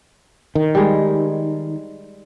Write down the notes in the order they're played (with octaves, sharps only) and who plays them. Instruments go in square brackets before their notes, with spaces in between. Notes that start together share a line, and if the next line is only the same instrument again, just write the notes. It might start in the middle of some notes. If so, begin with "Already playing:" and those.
[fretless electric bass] D#3
[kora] G3 G#3